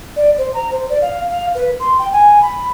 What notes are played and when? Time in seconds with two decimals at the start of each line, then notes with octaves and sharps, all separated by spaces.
0.16 D5
0.38 C5
0.54 A#5
0.71 C5
0.89 D5
1.02 F5
1.30 F5
1.55 B4
1.80 C6
1.99 G5
2.13 G#5
2.42 B5